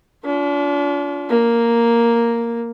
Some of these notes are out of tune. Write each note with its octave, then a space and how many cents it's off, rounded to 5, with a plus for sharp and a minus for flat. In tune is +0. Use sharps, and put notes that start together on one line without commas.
D4 -40 F4 +10
A#3 +0 A#4 +0